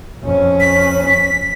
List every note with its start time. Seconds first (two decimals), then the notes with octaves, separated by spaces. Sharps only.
0.23 F2 C#4
0.60 B6